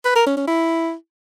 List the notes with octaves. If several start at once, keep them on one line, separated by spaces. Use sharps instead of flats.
B4
A#4
C#4
C#4
E4